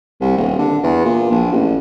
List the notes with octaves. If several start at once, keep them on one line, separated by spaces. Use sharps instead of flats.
C2
D#1
D3
E2
A#2
A#1
A1